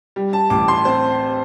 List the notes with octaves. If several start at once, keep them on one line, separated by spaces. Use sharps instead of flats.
G3
A5
A1 D6
C6
C4 C5